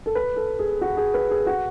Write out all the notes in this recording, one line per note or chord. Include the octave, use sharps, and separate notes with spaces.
A4
B4
A4
G#4
F#4
G#4
B4
G#4
F#4